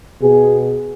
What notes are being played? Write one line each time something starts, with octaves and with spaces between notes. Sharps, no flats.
B2 G#4